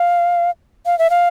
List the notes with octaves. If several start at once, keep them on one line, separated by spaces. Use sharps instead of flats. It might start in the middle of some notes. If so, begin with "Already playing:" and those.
Already playing: F5
F5
E5
F5